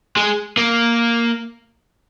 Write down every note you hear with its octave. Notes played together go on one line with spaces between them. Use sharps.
G#3
A#3